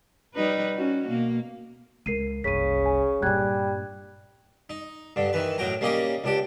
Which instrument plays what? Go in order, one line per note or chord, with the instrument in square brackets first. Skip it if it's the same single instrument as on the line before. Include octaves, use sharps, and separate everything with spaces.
[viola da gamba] G3 D#4 B4
C#4 F#4
B2 A#3
[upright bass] C#2 [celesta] A#4 C7 D#7
[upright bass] F#1 C2 [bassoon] C#3 [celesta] B6 D#7
[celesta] G#5
[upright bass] G2 A#2 [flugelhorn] G3 [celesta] F#6 G#6
[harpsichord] D#4
G2 D3
D#3 E3 B4
A2 F#3 G5 A#5
G3 A#3 C#4 D#4 G4 D#5
C#2 D4 G4